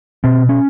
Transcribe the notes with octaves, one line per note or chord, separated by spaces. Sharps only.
B2 C4
C#4